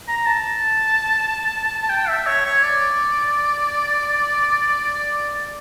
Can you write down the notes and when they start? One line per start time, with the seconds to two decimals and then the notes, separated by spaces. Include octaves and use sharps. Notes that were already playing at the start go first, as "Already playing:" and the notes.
0.08 A#5
0.26 A5
1.90 G5
2.08 E5
2.26 C#5
2.45 C#5
2.63 D5